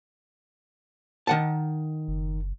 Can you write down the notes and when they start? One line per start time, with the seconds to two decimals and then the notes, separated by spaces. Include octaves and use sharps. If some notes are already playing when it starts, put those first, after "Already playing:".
1.27 D#3 F#5 A5
2.08 F#1